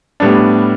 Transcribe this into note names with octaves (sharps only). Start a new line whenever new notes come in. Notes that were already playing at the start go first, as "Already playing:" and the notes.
A2 G3 B3 D4